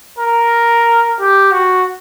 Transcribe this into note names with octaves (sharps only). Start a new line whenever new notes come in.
A#4
G4
F#4